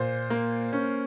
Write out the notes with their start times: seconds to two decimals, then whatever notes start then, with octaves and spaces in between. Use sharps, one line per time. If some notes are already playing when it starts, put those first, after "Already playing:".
Already playing: A#2 C5
0.30 A#3
0.73 C#4